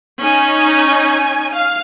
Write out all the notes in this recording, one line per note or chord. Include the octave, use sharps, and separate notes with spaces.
C#4 D#4 G#5
F5